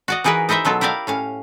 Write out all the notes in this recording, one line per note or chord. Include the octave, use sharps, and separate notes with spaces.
F#4 D5 D#5
E3 D#4 G#4 A#4 B4
D#4 E4 C5 D#5 E5
B2 F#3 F4 A4
E4 G4 A#4 D5 F5
A2 C#4 F5